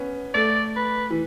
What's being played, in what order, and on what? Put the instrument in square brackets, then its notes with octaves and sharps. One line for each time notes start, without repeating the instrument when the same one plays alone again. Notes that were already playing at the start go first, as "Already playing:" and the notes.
Already playing: [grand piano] B3 C#4
[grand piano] A3 [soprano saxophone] D5
[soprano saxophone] B4
[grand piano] E3